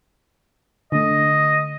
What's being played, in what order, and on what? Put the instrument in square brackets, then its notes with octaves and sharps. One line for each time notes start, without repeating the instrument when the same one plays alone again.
[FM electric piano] D3 A3 [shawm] D#5